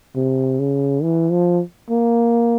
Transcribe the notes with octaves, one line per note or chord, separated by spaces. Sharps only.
C3
C#3
E3
F3
A#3